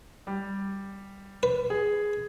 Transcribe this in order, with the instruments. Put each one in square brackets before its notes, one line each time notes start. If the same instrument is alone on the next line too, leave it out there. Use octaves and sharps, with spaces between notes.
[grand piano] G3
[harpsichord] B4
[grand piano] G#4